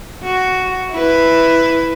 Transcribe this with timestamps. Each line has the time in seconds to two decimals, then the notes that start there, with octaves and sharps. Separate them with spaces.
0.23 F#4
0.91 E4 B4